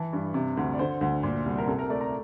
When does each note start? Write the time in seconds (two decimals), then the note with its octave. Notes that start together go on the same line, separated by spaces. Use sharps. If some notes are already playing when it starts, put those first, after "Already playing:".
Already playing: E3 A5
0.13 G2
0.34 C3
0.57 D2
0.74 D5
0.79 D3 C5
1.01 D2
1.23 A#2
1.46 C2
1.58 A#4
1.67 C3 A4
1.79 A#4
1.90 A3 D5
2.01 A#5